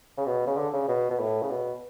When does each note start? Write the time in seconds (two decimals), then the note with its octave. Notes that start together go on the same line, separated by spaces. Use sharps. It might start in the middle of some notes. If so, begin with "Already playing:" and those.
0.17 C#3
0.26 B2
0.47 C#3
0.57 D3
0.73 C#3
0.88 B2
1.10 B2
1.20 A2
1.42 C#3
1.50 B2